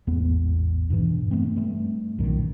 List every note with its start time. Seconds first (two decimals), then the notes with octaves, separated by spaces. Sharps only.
0.07 A1 E2 G#2 B3
0.90 G2 B2 E3
1.31 G2 A3 B3 C4
1.56 G2 A3
2.19 B1 F#2 A#2 D#3